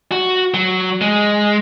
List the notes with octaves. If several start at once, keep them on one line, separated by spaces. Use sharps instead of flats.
F#4
F#3
G#3